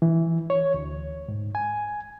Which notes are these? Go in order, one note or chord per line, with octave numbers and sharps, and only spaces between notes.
E3
C#5
D2
G#2
G#5